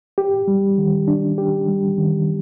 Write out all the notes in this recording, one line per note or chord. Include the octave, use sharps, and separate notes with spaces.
G4
G3
D#3
D4
G4
G3
D#3